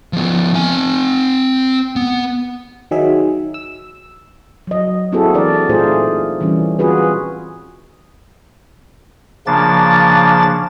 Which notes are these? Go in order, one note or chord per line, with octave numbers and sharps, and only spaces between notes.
F3 B3
C4 G#5
B3
D#3 F#3 G#4 E5
E6
F#3 D#5
A#3 C4 E4 F#4 G#4 A4
E3 D4 A#4 D5
A#2 A3 D#4 F4 G#4 C5
E3 G3 C#4
C4 F4 F#4 G#4 B4
C#3 F3 A#3 D4 A6